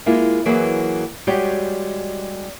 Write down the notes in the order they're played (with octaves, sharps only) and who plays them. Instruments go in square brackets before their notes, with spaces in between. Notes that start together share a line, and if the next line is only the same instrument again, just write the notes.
[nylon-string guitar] G#3 A#3 E4 F4
E3 F#3 A#3 G#4 B4
G3 G#3 F#4 G4 C#5 D5